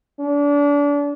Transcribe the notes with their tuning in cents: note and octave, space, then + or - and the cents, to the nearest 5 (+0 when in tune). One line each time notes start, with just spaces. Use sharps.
D4 -30